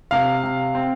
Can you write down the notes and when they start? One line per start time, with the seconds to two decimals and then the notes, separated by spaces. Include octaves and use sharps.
0.11 C3 F5
0.43 C3
0.75 C4